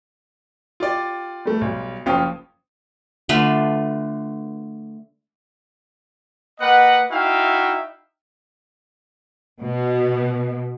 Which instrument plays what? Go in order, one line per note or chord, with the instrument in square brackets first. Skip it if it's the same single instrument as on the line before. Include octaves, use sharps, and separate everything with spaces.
[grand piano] F4 G4 D5
G3 A3
B1 G3
F#1 F3 C#4 F5 G5 D#6
[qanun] D3 A3 F4 B4
[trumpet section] A#3 B4 D#5 F#5
D#4 E4 F#4 E5 F5 G5
[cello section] B2